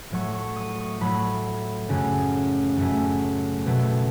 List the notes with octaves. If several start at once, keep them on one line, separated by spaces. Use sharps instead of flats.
A2 F#3 A3 C#6
C#6
D#6
C#6
A2 F#3 A3 B5
F#2 C#3 F#3 A3
F#2 C#3 F#3 A3
B2 F#3 A3